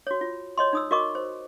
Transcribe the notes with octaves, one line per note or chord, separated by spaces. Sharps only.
F#4 C#5
F4
C#5 D#5 C6
D#4 D#6 E6
F#4 A#4 D#5 C#6 D6
C5